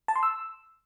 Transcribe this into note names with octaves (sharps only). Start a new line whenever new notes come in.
A5
C6
E6